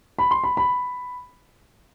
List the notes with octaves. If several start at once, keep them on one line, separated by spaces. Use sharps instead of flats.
B5
C6
B5
B5